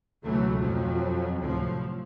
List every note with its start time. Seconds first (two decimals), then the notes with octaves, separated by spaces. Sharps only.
0.23 C#2 B2 E3 F#3 A3
0.59 F2 F3 F#3
1.40 D2 A2 C3 F3 F#3